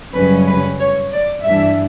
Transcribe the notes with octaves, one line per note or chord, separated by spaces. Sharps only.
F#2 C#3 G3 C#4 B4
B4
C#5
D5
G2 E3 G3 D4 E5